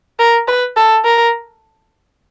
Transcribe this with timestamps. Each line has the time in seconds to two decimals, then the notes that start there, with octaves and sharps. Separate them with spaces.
0.19 A#4
0.48 B4
0.77 A4
1.05 A#4